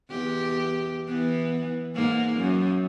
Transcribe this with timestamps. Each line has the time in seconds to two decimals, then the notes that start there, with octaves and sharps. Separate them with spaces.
0.10 E2 G4
1.08 E3 B3
1.95 G#2 A#3
2.37 F#2